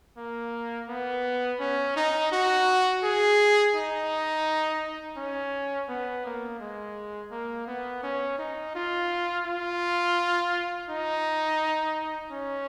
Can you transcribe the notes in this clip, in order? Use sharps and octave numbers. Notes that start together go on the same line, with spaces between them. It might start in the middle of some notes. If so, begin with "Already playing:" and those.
A#3
B3
C#4
D#4
F#4
G#4
D#4
C#4
B3
A#3
G#3
A#3
B3
C#4
D#4
F4
F4
D#4
C#4